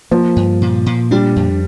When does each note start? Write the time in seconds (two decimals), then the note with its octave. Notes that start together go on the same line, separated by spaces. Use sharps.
0.11 F3 A#3
0.36 G2
0.62 A#2
0.86 A#2
1.11 G3 D4
1.36 F2